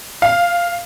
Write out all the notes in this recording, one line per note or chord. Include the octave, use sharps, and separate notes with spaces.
F5